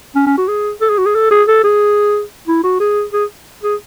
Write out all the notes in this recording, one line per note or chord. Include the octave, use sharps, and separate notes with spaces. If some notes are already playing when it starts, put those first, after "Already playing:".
C#4
C#4
F#4
G#4
A4
G#4
F#4
G#4
A4
G#4
A4
G#4
E4
F#4
G#4
G#4
G#4